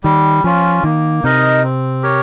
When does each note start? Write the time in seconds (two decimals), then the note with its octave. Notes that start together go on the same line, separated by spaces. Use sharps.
0.04 D#3 G3
0.44 F3 C#4 F4
0.84 D#3 A#3
1.23 C3 D#4 A#4 D#5
1.63 C4
2.03 G4 A#4 C#5